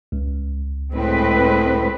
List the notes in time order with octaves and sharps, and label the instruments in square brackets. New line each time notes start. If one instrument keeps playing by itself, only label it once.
[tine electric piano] C#2
[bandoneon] A2 [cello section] G#3 C4 B4